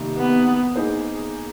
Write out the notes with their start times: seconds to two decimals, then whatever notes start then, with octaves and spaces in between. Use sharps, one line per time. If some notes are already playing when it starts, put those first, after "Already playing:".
Already playing: C3 D#3 G3 A#3
0.18 B3
0.76 A#3 D#4 G#4 C5